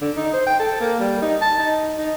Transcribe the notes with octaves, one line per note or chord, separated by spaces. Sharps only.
D3
D#4
C5
G5
A4
A#3
G3
D#4
A5
D#4
D#4